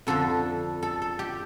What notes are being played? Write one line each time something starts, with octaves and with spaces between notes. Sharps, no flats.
F2 D3 F3 A4
A4
A4
G4